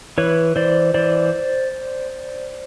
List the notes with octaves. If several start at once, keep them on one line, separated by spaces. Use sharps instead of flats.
E3 B4 C#5
E3 C5 D5
E3 C5 D5